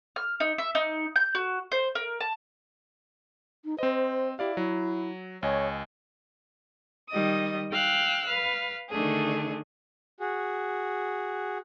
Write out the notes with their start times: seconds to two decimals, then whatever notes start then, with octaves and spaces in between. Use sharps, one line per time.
0.16 F6
0.40 D#4
0.58 E5
0.75 D#4
1.16 G6
1.35 F#4
1.72 C5
1.95 A#4
2.21 A5
3.65 D#4
3.78 C4 C5 D#5
4.39 E4 G4 D5 F5
4.57 F#3 E4
5.43 C#2 C#5 D#5 G#5
7.10 D#3 G3 D#5 D#6
7.72 F5 G5 E6 F#6
8.26 B4 F5
8.90 D3 D#3 A3 D4 G#4
10.20 F#4 G#4